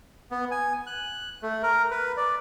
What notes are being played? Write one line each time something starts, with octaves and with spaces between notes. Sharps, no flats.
B3
G#5
F#6
A3
A#4
B4
D5